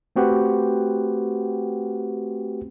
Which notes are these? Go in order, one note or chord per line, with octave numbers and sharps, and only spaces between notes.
A3 C4 F#4 G4 B4 F#5